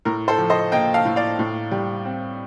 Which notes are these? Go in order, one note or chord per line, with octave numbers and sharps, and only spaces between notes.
A2 A#4
A4 C5
F3
C5 D#5
A#3 D#5 G5
F5 A5
A2
D5 F5
A2
G3
C4